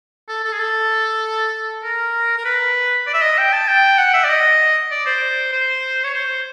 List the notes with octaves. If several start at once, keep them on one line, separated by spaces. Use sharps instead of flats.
A4
A4
G#4
A4
A#4
A#4
B4
D5
E5
D#5
G5
A5
G5
F#5
E5
D5
D#5
D5
C5
C5
C#5
C5